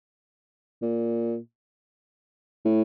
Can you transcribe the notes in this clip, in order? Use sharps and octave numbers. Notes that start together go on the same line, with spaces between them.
A#2
A2